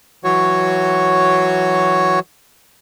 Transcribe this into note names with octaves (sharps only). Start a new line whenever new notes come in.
E3 F#3 F#4 C#5